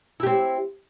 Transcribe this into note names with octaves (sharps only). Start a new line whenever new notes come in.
C4 E4 G4